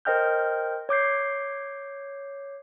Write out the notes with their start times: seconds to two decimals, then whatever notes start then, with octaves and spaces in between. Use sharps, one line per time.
0.05 A#4 C5 D#5 G5 F6 G6
0.89 C#5 D6 G6 C7